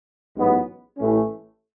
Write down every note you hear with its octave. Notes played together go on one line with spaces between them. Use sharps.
A1 G#2 F#3 B3
A1 A2 E3 A3 C#4